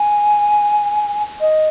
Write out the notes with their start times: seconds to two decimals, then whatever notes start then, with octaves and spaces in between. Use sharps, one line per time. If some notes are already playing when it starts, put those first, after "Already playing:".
Already playing: G#5
1.41 D#5